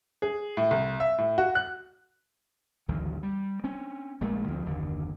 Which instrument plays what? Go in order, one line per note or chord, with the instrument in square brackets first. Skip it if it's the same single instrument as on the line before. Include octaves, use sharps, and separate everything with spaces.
[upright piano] G#4
A2
C2
E5
A2
F#4
F#6
[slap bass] G#1 D2 E3 F#3
G3
C4 C#4
A#1 A#2 G#3 A3
D2 F3 C4
F#1 D#2 D3